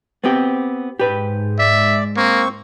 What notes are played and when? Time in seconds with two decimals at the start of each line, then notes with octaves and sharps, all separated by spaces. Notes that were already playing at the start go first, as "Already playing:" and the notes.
0.24 B3 C4 G4
1.00 G#2 G4 B4
1.59 D5 E5
2.17 A#3 C4 C#6